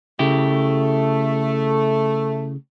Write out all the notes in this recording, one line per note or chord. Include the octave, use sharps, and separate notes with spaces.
C#3 A3 E4 G4